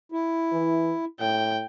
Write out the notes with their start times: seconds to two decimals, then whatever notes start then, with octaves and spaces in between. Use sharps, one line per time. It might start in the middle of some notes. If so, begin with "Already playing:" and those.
0.12 E4
0.52 E3
1.20 A2 G5